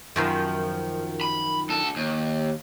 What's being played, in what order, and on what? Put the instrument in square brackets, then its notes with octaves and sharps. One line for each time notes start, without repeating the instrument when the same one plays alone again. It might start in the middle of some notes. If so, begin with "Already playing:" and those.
[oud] F#2 D#3 F3
[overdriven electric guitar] B5
D2 A4
D#2